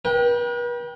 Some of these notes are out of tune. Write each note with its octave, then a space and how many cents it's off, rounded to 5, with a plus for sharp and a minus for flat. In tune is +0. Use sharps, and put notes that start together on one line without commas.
B4 -45 G5 +0